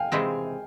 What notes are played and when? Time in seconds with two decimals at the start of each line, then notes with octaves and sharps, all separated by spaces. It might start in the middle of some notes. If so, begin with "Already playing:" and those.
Already playing: F5 G5 G#5
0.12 C3 E3 G#3 C4